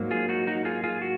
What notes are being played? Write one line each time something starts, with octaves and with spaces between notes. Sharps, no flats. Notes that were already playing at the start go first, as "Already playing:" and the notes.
Already playing: G#2 F#3 A#3
F4 G#4
D#4 F#4
D#4 F#4
F4 G#4
F4 G#4
F#4